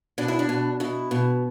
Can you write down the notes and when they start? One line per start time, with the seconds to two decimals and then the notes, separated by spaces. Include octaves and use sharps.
0.18 B2 D4
0.28 E4
0.39 D4
0.49 B2
0.80 B2 E4
1.11 B2